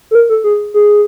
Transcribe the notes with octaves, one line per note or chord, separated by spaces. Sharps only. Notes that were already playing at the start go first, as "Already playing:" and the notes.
A4
A#4
A4
G#4
G#4